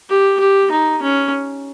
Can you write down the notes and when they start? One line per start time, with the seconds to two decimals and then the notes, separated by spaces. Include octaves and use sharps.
0.10 G4
0.40 G4
0.71 D#4
1.02 C#4